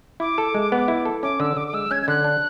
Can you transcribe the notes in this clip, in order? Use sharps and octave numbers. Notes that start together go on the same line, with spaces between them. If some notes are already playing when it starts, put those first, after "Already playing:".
E4 D6
A4
G#3
B3
E4
A4
C#4 D6
D3 E6
D3 D6
D6
G#3 E6
C#4 G#6
G#6
D3 F#6
D4